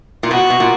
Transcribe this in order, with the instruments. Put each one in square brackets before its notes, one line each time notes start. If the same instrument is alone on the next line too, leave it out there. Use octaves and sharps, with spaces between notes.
[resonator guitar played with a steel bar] A#2
[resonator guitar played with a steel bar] B2 [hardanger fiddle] F#4
[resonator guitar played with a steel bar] B2
A#2